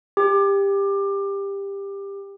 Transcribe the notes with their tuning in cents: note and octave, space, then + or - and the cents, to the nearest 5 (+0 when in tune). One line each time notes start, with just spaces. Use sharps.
G4 +20